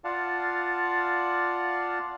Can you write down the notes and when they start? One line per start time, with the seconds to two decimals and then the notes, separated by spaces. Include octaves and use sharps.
0.04 F4 D5 F5 F#5 A5